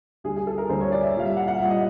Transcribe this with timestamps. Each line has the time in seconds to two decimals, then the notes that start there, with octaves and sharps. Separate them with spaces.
0.24 D2 D3 G3 G#4
0.36 G#4
0.47 A4
0.58 A#4
0.69 D2 D3 G3 C5
0.81 C#5
0.92 D5
1.03 E5
1.15 A#2 G3 F5
1.25 E5
1.37 F#5
1.48 F#5
1.59 A#2 G3 E5
1.70 D#5